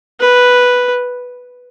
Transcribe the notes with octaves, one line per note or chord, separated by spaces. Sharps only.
B4